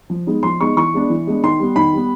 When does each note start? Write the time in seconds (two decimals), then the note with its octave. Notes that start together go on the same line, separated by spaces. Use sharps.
0.10 F3
0.27 G#3 B3 D#4
0.43 F3 C6
0.60 G#3 B3 D#4 C#6
0.76 E3 C#6
0.94 G#3 B3 D4
1.10 E3
1.27 G#3 B3 D4
1.43 D#3 C6
1.59 G3 B3
1.76 D#3 B5
1.93 G3 B3